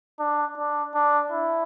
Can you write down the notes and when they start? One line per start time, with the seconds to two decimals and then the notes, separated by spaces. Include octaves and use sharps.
0.19 D4
0.57 D4
0.94 D4
1.32 E4